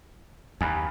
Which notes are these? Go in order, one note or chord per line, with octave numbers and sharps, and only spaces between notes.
D#2 G#5 B5